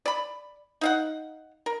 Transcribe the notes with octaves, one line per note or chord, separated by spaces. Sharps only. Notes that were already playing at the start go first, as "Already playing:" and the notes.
D5 B5
D#4 F5 F#5
A#4